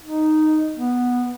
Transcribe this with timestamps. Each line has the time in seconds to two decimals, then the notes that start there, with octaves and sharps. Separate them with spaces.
0.03 D#4
0.76 B3